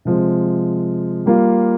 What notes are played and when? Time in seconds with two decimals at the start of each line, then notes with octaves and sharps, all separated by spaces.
0.05 C3 F3 G#3
1.26 G3 A#3 F4